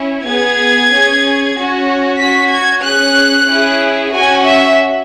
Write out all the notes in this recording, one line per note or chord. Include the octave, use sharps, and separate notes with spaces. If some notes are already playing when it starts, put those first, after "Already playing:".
Already playing: C#4 E4
B3 G#4 G#6
C#4 G#4
C#4 F#4
C#4 F#4 B6
G#6
C#4 G#4 F#6
C#4 E4 G#4
C#4 F#4 G#5
E5